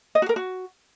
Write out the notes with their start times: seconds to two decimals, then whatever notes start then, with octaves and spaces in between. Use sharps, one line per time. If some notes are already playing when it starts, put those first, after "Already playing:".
0.15 D#5
0.22 F#4
0.29 A#4
0.36 F#4